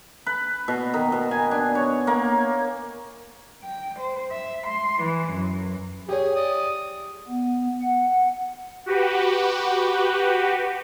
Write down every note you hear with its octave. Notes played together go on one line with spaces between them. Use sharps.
B4
B2
D#3
B2
G#5
D4
C#5
A#3
G5
C5
E5
C6
E3
F#2
G4 G#4 C#5
D5 D#6
B3
F#5
F#4 G4 B4